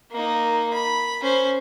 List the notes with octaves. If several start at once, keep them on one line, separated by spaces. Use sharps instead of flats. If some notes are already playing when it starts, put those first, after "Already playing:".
A#3 D#4
B5
C#4 C5